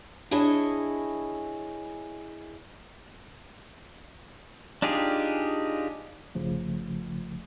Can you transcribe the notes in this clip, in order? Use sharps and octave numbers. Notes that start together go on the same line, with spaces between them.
D4 E4 G#4 C#5 D#5 G#5
D4 D#4 F4 G4 G#4
G1 C#3 F3 A3